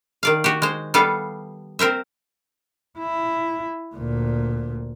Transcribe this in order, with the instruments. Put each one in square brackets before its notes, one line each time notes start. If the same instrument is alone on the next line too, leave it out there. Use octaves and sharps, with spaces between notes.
[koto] D#3 D5 F5
F#4 G4
G#3 C5
G3 B3 A4 F5
C4 A#4 C5 E5
[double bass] E4
D2 A#2